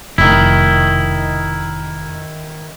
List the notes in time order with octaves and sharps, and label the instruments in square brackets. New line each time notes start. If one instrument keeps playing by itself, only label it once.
[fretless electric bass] F1 [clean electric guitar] D#3 E4